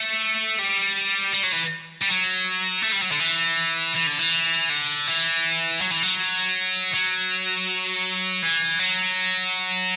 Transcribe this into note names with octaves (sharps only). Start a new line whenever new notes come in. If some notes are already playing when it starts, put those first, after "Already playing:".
Already playing: A3
G3
G3
F#3
E3
G3
F#3
A3
G3
F#3
D3
E3
E3
D3
E3
D3
E3
F#3
E3
F#3
F#3
E3
F#3